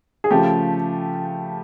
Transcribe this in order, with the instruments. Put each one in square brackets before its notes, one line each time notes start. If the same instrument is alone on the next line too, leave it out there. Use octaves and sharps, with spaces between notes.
[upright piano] G#4
[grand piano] C#3 F3 A3 [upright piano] G4